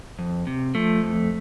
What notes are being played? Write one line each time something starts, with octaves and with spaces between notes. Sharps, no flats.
F2
C3
F3 A3
F2